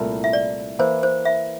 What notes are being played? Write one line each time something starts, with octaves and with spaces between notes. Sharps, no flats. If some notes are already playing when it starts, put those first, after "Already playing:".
Already playing: C2 A#2 A3 E4 A#4
E5
D5
E3 A#3 E4 C5
C5
E5